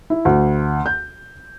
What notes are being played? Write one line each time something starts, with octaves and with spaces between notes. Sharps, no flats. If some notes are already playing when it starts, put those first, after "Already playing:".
E4
D2
G6